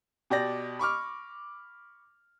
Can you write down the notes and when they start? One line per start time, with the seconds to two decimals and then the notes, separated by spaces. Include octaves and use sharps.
0.30 B2 G4 D5 A#6
0.79 B5 C#6 D6 F6